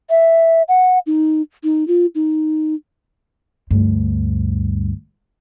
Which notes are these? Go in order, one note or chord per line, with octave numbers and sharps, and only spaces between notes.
E5
F#5
D#4
D#4
F4
D#4
D2 G2